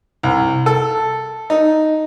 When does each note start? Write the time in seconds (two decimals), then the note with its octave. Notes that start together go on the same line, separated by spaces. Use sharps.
0.23 C2
0.66 A4
1.50 D#4